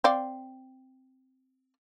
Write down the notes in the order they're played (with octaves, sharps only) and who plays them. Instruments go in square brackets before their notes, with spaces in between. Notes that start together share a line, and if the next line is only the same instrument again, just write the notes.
[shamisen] C4 D5 F5